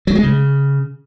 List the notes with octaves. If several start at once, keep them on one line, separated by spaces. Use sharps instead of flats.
F#3
G#3
C#3